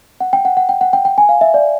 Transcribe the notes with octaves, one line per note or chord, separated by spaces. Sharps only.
F#5
G5
F#5
F#5
G5
F#5
G5
G5
G#5
F5
E5
D5